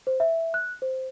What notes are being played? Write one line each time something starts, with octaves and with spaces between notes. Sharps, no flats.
C5
E5
F#6
C5